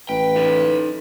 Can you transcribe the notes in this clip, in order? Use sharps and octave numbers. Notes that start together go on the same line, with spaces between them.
A1 B4 G5
D#4 A4